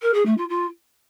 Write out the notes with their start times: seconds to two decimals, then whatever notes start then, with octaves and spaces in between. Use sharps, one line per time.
0.02 A#4
0.14 G#4
0.25 A3
0.37 F4
0.49 F4